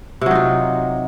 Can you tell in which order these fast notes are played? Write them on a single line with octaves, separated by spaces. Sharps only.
C3 F#3 D#4 F4